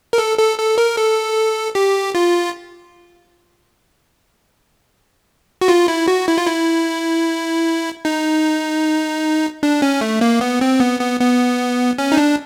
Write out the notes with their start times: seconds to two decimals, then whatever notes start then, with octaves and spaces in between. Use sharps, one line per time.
0.13 A#4
0.18 A4
0.38 A4
0.58 A4
0.78 A#4
0.97 A4
1.75 G4
2.15 F4
5.61 F#4
5.68 F4
5.88 E4
6.08 F#4
6.28 E4
6.38 F4
6.47 E4
8.05 D#4
9.63 D4
9.82 C#4
10.01 A3
10.21 A#3
10.41 B3
10.61 C4
10.80 B3
11.01 B3
11.20 B3
11.98 C#4
12.12 D#4
12.17 D4